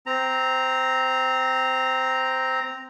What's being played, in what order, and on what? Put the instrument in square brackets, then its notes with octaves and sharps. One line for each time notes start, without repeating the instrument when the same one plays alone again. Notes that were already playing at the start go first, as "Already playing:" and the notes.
[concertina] C4 A#5